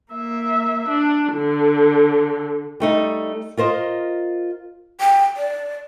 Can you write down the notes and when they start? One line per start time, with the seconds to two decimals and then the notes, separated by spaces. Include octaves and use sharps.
0.13 A#3 E5
0.89 D4
1.34 D3
2.80 G3 A3 D#4
3.57 F4 A#4 C5 D#5
5.01 G5
5.37 D5